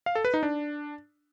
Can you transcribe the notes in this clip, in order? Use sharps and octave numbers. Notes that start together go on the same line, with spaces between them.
F5
A4
B4
D#4
D4